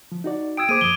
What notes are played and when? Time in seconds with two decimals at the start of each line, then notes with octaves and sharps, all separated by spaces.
0.12 F3
0.24 D#4 F#4 D5
0.57 G5 D#6 E6 G#6 D7
0.69 A#3 G#4 C5 D6 G#6 D#7
0.81 F#2 F3 D#6 G7